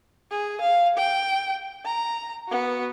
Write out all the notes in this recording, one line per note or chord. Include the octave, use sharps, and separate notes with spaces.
G#4
F5
G5
A#5
B3 F#4